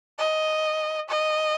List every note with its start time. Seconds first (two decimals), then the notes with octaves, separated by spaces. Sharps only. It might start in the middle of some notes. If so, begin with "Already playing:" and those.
0.18 D#5
1.09 D#5